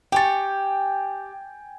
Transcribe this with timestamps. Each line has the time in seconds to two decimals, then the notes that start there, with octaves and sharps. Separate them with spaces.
0.12 G4 G5 G#5 C#6 A6